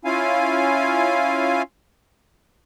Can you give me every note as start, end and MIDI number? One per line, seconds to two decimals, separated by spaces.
0.05 1.62 61
0.05 1.62 64
0.05 1.62 65
0.05 1.62 77
0.05 1.62 80